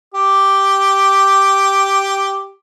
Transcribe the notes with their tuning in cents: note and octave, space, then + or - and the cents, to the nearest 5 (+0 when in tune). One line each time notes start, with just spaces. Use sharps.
G4 +0 D6 +0